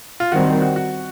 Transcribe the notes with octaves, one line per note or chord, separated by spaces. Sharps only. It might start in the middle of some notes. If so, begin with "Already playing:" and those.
F4
D#3 G3 C4 F#4
F#4
F#4